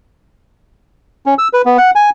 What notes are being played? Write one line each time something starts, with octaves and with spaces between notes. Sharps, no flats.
C#4
E6
B4
B3
F#5
G#5